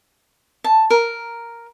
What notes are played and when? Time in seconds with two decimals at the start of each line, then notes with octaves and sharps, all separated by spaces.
0.64 A5
0.90 A#4